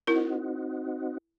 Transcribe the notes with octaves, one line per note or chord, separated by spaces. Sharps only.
C4 D#4 E4 F#4 A#4